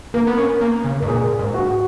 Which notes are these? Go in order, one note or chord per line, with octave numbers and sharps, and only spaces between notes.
A#3 A#4
B3
C#4
A#3
C#3
G#2 A#4
A#2 G#4
G#2
F#4